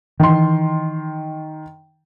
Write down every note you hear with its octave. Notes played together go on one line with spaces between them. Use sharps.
D#3 E3 C6